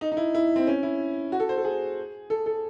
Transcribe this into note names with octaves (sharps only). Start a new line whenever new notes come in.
D#4
D#4
E4
E4
C4
C#4
E4
F#4
A4
C5
A4
G#4
A4
A4